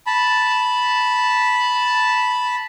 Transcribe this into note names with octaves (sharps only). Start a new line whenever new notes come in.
A5 B5